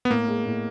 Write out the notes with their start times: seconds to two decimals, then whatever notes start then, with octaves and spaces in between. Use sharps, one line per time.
0.05 B3
0.10 A2 A#3
0.28 G#3
0.46 A2